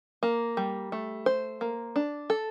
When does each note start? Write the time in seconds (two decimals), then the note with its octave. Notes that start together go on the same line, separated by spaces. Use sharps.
0.23 A#3
0.57 G3
0.92 A3
1.26 C5
1.61 A#3
1.96 D4
2.30 A4